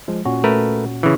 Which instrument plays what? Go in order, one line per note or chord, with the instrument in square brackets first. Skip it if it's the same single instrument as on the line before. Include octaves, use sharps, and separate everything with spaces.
[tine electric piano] F3 G#3
A#2 C#4 F#4
[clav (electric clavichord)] A3 A#4 B4
C#3 E3